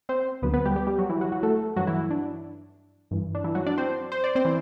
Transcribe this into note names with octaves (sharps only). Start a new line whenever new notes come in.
C4 C5
D2 D3 F#3 B3 B4
B3 B4
G3 G4
G3 G4
G3 G4
F#3 F#4
E3 E4
F#3 F#4
F#3 F#4
A3 A4
G2 E3 F#3 F#4
E3 E4
D4
G2 E3
D4
E3 E4
F#3 F#4
D4 D5
C4 C5
C5
D5
C4 C5
E3